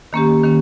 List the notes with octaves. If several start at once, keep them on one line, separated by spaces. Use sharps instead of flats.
D#3 A#3 C#4 G4
D#3 A#3 C#4